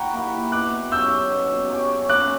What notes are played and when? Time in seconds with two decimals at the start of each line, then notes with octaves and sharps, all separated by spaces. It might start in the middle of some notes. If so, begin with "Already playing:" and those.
Already playing: F#5 G5 A#5 B5 C#6
0.13 A#3 E4 G4
0.52 B2 D6 F#6
0.92 F#3 C#4 G4 E6 G6
1.31 B2
1.70 F#3 C#4 G4
2.09 C#3 D6 F#6